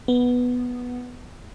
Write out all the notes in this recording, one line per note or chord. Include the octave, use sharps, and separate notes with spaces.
B3